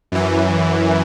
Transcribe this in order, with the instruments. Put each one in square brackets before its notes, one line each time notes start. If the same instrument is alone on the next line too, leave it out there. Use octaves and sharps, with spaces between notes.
[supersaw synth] F#2 E3